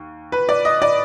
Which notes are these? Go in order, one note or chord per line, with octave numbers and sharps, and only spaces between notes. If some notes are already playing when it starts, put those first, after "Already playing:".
Already playing: D#2
B4
D5
D#5
D5